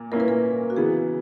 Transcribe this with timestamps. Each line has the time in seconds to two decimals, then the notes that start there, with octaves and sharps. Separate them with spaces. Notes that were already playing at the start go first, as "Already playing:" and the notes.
Already playing: A#2 A#3
0.11 A#2 A#3 C#4 E4 A#4
0.20 B4
0.28 A#4
0.70 F#4
0.76 C#3 E3 B3 G#4